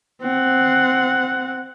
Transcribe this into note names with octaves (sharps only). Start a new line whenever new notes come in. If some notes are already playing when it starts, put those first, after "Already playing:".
C4 F#5